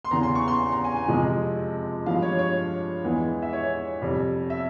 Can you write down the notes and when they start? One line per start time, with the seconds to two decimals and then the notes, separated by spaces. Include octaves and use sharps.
0.05 C6
0.11 E2 C#3 E3 A#5
0.23 C6
0.35 C#6
0.48 C6
0.60 C6
0.72 A#5
0.84 G#5
0.96 G#5
1.08 F2 C3 F3 G#3
2.06 G2 F3 G#3 F5
2.22 C#5
2.39 C#5
3.03 E2 E3 G#3
3.42 E5
3.53 C#5
4.02 F2 C3 G3
4.50 E5